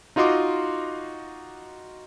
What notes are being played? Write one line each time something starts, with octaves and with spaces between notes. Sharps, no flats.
D#4 F4 F#4 D#5 C6 D6